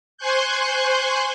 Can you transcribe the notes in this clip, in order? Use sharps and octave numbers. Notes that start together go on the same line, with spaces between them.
C5 G#5 C6 C#6 F#6 G6